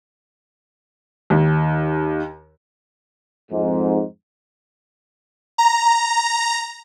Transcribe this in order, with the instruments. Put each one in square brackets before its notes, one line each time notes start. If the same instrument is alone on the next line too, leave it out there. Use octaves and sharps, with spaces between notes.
[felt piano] D#2
[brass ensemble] F2 G#2
[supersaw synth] A#5